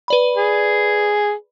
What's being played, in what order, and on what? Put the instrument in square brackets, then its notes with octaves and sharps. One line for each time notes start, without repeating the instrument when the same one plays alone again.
[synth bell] B4 D5 B5
[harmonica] G#4